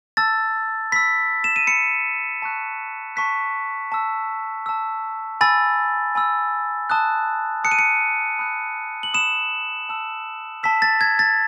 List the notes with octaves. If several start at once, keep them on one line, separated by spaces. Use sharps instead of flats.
A5 E6 A6
B5 E6 B6
E7
D#7
B5 E6 C#7
A5 C#6 F#6
A5 C#6 F#6 B6
A5 E6
A5 E6
G#5 B5 E6 A6
G#5 B5 E6
A5 D#6 F#6
A5 D#6 F#6 C#7
D#7
C#7
B5 D#6 F#6
F#7
B5 D#6 F#6 E7
A5 E6
A5 E6 B6
A6
G#6
A6